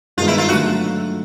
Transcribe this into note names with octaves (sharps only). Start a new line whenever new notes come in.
G2 D#3 G#3 B3 D#4 F4
E4
F4
D3 F#3 A3 F#4